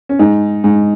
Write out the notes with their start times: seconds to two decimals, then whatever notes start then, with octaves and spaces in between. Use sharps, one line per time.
0.09 C#4
0.19 G#2 D#4
0.64 G#2